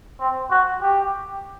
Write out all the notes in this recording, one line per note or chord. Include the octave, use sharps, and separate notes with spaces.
C4
F#4
G4